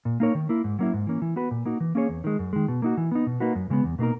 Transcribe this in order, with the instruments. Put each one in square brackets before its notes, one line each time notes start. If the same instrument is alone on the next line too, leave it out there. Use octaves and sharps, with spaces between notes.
[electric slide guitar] A#2
A#3 D#4 A#4 C#5
D#3
A#3 E4
G#2
F#3 A#3 C#4 E4
G#2
E3 A#3 C#4
E3
B3 F#4 B4
A#2
A#3 D#4 F#4
E3
A#3 C#4 G#4 C#5
E2
D#3 G#3
F#2
D#3 G#3
B2
A#3 D#4 F#4
E3
B3 D#4
B2
A#3 D#4 F#4 B4
F#2
C#3 G#3 B3
E2
B2 A#3 D#4 A#4